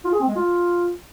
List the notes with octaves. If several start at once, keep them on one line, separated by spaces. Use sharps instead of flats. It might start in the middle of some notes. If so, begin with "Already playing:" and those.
F4
G#4
C4
G#3
F4